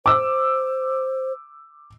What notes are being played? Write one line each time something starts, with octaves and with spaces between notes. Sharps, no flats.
C5 D6 E6